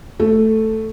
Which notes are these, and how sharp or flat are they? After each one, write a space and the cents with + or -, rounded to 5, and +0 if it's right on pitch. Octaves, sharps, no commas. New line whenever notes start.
A3 +0 A4 +0